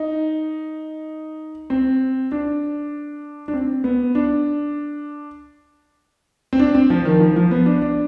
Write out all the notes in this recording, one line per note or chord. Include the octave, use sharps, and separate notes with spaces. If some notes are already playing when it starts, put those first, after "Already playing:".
Already playing: D#4
C4
D4
D4
C4
B3
D4
C4
D4
C4
F3
D#3
F3
F3
B3
D4
D4